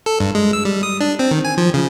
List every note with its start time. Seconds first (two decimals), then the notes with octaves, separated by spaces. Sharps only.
0.06 A4
0.20 G2
0.35 G#3
0.53 E6
0.65 G3
0.83 D#6
1.01 D4
1.19 C4
1.31 D#3
1.45 G#5
1.58 F3
1.74 C#3